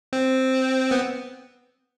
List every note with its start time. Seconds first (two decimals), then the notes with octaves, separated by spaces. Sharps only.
0.13 C4
0.91 B3